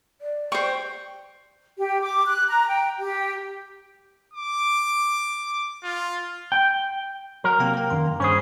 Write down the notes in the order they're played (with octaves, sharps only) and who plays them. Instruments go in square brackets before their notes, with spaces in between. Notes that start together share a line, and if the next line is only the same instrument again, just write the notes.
[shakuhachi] D5
[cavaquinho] C5 C#6 [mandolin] G5
[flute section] G4
D6
F#6
A#5
G5
G4
[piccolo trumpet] D6
F4
[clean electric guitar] G5
[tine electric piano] F#3 F#5 [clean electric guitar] A#4
[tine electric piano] C3 G5 A#5 [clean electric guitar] A#3
[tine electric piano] A#4 G5
F#2 D#3 C6
A#5
[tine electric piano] G2 C5 B5 [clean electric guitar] C#4 G#4